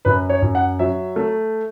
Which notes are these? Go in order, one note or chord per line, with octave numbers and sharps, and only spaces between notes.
F#2 B4
C#5
F#2
F#5
F#3 E5
A3